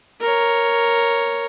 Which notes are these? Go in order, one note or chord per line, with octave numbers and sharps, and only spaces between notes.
A#4 C#5